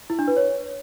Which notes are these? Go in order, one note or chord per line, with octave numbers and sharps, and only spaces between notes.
E4
D4
B4
C#5